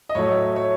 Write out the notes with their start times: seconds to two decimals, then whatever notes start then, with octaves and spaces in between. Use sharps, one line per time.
0.09 D#5
0.15 A2 F#3 A3 C#5
0.56 C#5